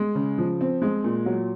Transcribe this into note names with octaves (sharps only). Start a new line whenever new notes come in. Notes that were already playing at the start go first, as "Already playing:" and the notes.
Already playing: G#3
C#3
F3
C4
G#3
A#2
F#3